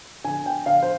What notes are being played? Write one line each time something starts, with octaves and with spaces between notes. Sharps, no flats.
D3 G#5
G5
D3 F5
C5